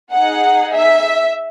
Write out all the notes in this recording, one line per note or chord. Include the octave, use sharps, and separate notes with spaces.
D#4 G#4 F#5
E5